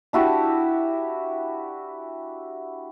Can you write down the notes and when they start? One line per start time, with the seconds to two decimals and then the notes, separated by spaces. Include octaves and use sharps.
0.13 D4 E4 F#4 G4